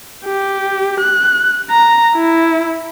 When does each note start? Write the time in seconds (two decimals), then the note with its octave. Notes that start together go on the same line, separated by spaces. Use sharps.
0.25 G4
1.00 F#6
1.70 A#5
2.16 E4